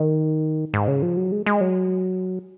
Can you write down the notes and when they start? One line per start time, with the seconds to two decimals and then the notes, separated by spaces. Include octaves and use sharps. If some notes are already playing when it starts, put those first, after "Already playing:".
Already playing: D#3
0.74 G#2
0.88 C#3
1.02 F3
1.17 F#3
1.32 G#3
1.46 G#3
1.61 F#3